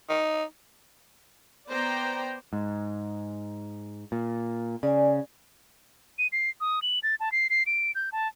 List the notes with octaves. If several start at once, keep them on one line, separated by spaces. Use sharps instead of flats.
D#4
B3 C5 D5 G5 A#5
G#2
A#2
C#3 D5 G#5
D#7
C7
D#6
F#7
A6
A5
C7
C7
D7
G6
A5